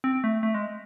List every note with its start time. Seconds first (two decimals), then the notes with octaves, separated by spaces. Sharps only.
0.04 C4
0.24 A3
0.43 A3
0.54 G#3